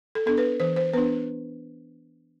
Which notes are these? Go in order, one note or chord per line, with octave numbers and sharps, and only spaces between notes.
A4
B3 D4 A4
B4
E3 C5
C5
B3 D4 B4